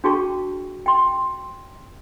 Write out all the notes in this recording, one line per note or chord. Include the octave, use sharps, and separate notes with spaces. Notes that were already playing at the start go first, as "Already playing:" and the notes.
D4 F#4 G#4 G5 A5 C#6
G5 C6